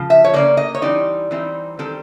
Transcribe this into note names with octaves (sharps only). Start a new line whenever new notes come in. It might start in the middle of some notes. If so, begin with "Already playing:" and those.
Already playing: C#3 F3
E5
C#5
C#3 F3 A#3 D5
D#5
C#5
E3 G3 C4 D#4 D5
E3 G3 C4 D#4
D#3 G3 C4 A4